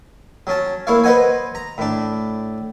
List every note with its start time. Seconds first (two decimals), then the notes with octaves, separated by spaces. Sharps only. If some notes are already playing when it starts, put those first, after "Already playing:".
0.47 F#3 C#4 A5
0.87 A#3 E4 C#5 F5
1.04 B4 C5 D#5 F#5 G#5
1.55 A#5
1.78 A2 D4